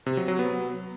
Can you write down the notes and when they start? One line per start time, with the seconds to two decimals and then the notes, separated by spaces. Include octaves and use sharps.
0.06 C3
0.17 F#3
0.28 F#3
0.39 B3